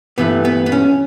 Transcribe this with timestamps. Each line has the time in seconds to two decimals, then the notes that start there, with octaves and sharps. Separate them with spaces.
0.18 G2 E3 A3 B3
0.45 B3
0.66 B3
0.72 C#4